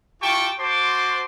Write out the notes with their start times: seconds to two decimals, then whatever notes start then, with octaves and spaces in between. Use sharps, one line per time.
0.21 E4 F4 G4 G5 A5 C#6
0.59 F#4 C5 A5 C6 D6